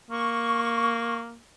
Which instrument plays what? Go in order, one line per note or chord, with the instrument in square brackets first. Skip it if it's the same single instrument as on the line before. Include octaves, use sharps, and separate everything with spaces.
[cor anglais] A#3 [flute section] C#6